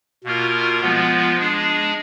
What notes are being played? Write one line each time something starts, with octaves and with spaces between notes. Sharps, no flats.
B2 A#3 F4 A#4
F3 G#3 B3 F4
G#3 D4 G#4